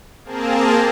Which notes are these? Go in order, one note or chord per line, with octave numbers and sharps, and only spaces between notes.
A#3 C4 G#4 A#4 A5